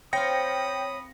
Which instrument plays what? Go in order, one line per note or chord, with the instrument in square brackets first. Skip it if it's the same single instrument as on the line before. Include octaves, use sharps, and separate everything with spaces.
[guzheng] C4 F4 [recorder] C#5 [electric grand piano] G5 A#6 C#7 [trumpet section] B5 D#6